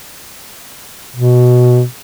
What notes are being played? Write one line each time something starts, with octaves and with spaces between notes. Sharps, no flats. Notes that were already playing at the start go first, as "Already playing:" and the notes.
B2